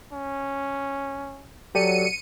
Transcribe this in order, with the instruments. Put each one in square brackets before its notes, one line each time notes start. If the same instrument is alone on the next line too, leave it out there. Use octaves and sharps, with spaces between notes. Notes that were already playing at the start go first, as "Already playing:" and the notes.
[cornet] C#4
[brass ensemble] F#3 [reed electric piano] G4 A4 D5 [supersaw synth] C#7 D#7